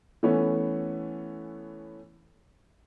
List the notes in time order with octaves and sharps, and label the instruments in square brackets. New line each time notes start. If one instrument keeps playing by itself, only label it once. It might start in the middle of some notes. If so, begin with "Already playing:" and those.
[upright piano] E3 A3 B3 C#4